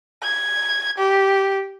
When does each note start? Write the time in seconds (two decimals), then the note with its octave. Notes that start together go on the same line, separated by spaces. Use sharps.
0.23 G#6
0.98 G4